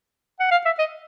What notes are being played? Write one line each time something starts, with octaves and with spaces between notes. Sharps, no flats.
F#5
F5
E5
D#5